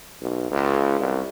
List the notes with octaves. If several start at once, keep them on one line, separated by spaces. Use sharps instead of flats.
B1
C#2
C2